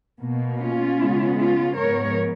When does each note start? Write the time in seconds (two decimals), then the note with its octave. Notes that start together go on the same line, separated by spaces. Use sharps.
0.20 B2 A#3
0.59 C#4 F4
0.97 C#3 G#3 B3
1.36 C#4 F4
1.75 G#2 F3 B3 A#4 C#5